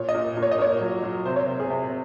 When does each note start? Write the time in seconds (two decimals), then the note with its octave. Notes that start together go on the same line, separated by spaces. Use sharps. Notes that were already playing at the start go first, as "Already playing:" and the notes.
Already playing: A#2 C#5
0.09 D#5
0.14 A#2
0.37 A#2
0.42 C#5
0.51 D#5
0.59 A#2 C#5
0.81 F#3
1.04 F#3
1.26 C3 C5
1.36 C#5
1.46 C3 C5
1.60 G#4
1.70 C3